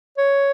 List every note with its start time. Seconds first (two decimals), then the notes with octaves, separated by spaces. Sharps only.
0.18 C#5